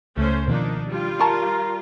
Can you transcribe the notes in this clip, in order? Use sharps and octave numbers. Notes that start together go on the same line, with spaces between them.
C#2 A3 C#4 C5
B2 D#3 F3 A#3 D4 D#4
G3 F4
A#4 A5 C#6